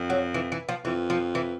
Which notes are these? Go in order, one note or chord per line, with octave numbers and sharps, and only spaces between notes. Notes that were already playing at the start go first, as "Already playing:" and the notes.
Already playing: F2
F#3
E3
E3
F3
F2 E3
F3
E3